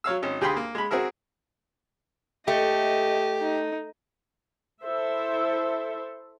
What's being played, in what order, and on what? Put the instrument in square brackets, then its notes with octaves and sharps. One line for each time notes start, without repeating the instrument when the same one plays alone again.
[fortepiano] F#3 C#5 F5 E6
G#1 C#4
D2 G4 G#4 G5 B5 C6
A#3
G#3 B5
C4 F#4 G#4 A#4 E5
[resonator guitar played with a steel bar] A3 [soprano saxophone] G4 [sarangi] D#5
[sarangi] D#4
[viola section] E4 A4 C5 E5